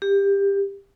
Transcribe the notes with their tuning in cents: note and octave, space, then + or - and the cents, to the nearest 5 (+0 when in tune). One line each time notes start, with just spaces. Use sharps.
G4 +20